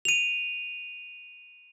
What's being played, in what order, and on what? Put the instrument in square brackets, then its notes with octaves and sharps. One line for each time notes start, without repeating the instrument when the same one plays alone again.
[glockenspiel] D#7 F7